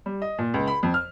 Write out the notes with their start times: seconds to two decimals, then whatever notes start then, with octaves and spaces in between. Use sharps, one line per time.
0.06 G3
0.22 D#5
0.38 A#2
0.54 C#2
0.68 B5
0.83 F2
0.94 F6